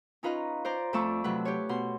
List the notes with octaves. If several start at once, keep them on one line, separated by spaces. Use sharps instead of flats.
C#4 D#4 F4 B4 D#5 A#5
C5 D5 A#5
F2 A3 D5 A5 C#6 E6
C3 F#3 A3 B4
G4 C#5
B2 C6